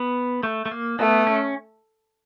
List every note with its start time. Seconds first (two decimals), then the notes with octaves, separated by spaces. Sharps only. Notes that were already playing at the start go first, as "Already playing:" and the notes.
Already playing: B3
0.43 A3
0.66 A3
0.71 A#3
0.99 A3 B3
1.27 C#4